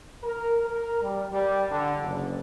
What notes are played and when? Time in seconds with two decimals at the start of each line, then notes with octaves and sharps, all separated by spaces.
0.24 A#4
0.65 A#4
1.02 G3
1.32 G3
1.70 D3
2.02 F#1